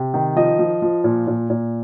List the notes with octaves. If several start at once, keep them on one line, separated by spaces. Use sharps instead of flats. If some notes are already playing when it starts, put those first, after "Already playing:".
Already playing: C3
D#3
F3 D#5
F3
F3
A#2
A#2
A#2